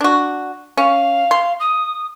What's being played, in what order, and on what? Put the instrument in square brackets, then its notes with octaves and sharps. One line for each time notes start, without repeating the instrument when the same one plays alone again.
[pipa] D4 F#4
[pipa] C#4 [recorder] F5
[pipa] C6
[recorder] D#6